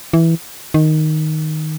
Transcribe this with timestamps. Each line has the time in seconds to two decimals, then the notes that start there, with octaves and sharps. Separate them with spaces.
0.13 E3
0.74 D#3